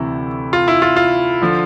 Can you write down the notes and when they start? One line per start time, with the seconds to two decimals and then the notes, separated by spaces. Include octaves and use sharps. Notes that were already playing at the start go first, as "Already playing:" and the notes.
Already playing: D2 C3 E3 E4
0.53 F4
0.68 E4
0.82 F4
0.96 F4
1.42 D3 F3